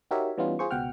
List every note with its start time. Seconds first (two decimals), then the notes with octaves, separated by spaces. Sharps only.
0.11 D#4 F#4 G4 A#4 C#5 E5
0.37 E3 G3 B3 C#4 D#4 F4
0.59 F4 G#4 C5 C#6
0.71 C#2 B2 F#5 G5 F6